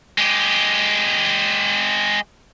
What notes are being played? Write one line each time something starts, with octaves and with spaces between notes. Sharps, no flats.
G#3 G4